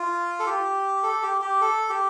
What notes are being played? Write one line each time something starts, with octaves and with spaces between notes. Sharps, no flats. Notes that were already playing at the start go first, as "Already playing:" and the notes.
Already playing: F4
A4
G4
A4
G4
G4
A4
G4